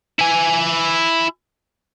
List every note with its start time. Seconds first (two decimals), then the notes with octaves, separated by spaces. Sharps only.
0.19 E4 G#5